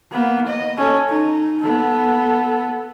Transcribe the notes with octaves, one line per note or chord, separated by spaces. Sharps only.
A#3 B3
D#5
C#4 A4
D#4
B3 A4